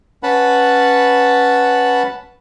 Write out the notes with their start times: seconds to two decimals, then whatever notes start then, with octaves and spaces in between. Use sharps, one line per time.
0.23 C#4 B4 F#5 A5 B5